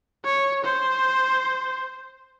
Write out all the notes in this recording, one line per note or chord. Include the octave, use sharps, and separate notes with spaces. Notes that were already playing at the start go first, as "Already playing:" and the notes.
C#5
C5